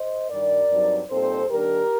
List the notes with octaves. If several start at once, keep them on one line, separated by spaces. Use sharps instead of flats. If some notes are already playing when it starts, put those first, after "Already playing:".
Already playing: C5 D#5
G2 D#3 G3 A#4 D5
G2 F#3 C4 D#4
A#2 G3 C4 D#4 A4 C5
D#2 D#3 G3 D4 G4 A#4